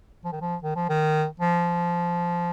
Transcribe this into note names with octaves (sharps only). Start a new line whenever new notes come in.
F3
D#3
F3
D#3
F3
D#3
F3